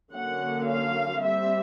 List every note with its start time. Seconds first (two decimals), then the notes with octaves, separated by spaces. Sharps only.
0.13 D3 F#3 A#3 C#4 F#5
0.67 F5
1.20 G3 C4 E5